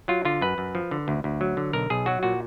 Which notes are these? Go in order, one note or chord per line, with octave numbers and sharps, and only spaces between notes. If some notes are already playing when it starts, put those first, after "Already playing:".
F#3 F4
D3 F4
F#2 B4
F#2
F3
D3
D2
D2
F#3
D3
B1 A#4
B1 G#4
F#3 F#4
A#2 F#4